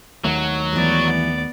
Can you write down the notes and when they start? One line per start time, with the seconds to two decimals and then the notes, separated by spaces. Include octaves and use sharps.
0.25 D#2 D#3 F#3 A3
0.73 E3 G#3 B3 D5